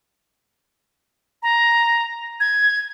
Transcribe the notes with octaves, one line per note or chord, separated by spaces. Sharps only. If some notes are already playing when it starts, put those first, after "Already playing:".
A#5
G#6